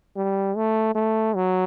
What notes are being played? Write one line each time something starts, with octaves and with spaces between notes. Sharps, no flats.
G3
A3
A3
F#3